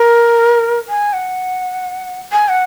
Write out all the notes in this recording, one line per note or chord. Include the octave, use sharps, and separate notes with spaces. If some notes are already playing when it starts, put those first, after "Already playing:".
Already playing: A#4
G#5
F#5
G#5
F#5